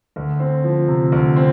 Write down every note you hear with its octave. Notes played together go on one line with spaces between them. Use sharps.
D2
C4
F3
C3
D2
C4